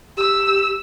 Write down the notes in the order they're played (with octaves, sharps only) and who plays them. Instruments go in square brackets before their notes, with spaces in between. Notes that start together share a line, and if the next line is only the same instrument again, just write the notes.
[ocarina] G4 [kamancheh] E6